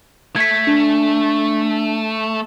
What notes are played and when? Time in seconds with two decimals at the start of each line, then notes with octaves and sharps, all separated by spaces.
0.36 A3 G#6 B6
0.67 D4